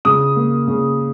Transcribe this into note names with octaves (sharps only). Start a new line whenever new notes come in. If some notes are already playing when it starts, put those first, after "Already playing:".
C#3 D#6
A#3
C#3